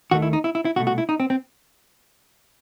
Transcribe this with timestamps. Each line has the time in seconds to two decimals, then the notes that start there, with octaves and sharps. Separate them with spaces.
0.11 D#2 D#3 A3 F#4
0.22 E4
0.33 D#4
0.44 E4
0.55 E4
0.65 E4
0.76 C2 B2 A3 F#4
0.87 F#4
0.98 E4
1.09 D#4
1.20 C4
1.30 C4